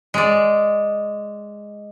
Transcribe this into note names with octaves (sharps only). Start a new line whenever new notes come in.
G#3 D5